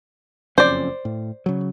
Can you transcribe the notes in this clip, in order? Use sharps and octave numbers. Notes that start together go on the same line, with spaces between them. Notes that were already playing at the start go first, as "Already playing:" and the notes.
F#1 F2 C#4 C5 D5
A2
C#3 F#3